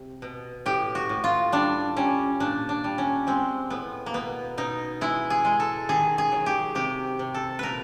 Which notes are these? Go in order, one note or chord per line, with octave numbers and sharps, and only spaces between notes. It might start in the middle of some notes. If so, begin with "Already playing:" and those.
Already playing: C3
B2
A2 G4
F#4
A2
F4
G3 D4
G3 C#4
A#2 D4
D4
G3
C#4
G#3 C4
A2 B3
A#3
B2 B3
B2 D#4
G#3 E4
G#4
G#3
A4
D#3 G#4
G#4
F#3
G4
C3 G4
C3
A4
A#2 A#4 B4